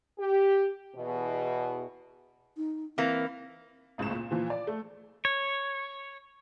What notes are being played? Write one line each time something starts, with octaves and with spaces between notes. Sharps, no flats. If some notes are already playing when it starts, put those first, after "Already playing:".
G4
E2 B2
D#4
E3 A#3 C4
G#1 C#2 A2 C#3 E7
A#2
A#2 E3 F3
D5
A3
C#5